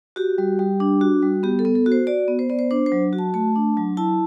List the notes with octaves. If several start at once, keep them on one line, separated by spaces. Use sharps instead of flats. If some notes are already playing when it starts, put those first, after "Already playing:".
F#4 G4
G3
G3
D4
F#4
G3
B3 G4
A4
B3
A4
F#4
C5
F#4 D5
B3
C5
B3 D5
C5
D4 C5
C5
F#3
F#4
A5
A3 A5
D4
F#3
E4 A5